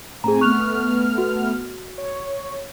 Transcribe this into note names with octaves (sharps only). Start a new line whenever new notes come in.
A2 C4 G#4 G#5 A#5
A3 B3 C#6 F6 F#6 F7
F#4
C#5